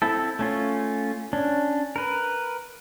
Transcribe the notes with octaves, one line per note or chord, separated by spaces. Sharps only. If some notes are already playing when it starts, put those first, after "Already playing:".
C4 E4 A4
A3 C#4 F4
C#4 D4
A#4 B4